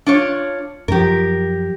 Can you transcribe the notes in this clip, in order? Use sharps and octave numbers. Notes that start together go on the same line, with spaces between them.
D4 F4 C#5
F#2 F3 G4 A#4